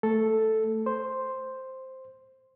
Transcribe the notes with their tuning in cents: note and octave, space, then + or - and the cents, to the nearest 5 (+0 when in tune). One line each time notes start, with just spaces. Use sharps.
A3 +0 A4 +0
C5 +0 C6 +0